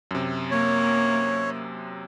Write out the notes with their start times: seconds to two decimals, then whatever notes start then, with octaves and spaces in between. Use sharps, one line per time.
0.11 F#2 C3
0.51 A#3 C#5